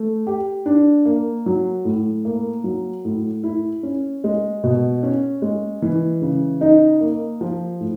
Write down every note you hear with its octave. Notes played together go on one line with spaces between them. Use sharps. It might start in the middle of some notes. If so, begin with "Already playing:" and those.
Already playing: A3
G4
D4
A#3
F#3
A2
A#3
F#3
A2
E4
C#4
G#3
B2
C#4
G#3
E3
C#3
D#4
A#3
F3
A2